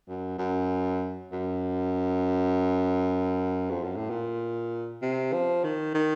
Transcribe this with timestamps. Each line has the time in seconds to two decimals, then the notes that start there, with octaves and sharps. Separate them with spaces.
0.08 F#2
0.38 F#2
1.32 F#2
3.71 F2
3.84 F#2
3.96 A2
4.10 A#2
5.02 C3
5.33 F3
5.64 D#3
5.94 D#3